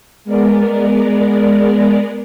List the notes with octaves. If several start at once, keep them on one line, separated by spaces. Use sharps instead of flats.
G#3 B3 A#4 D5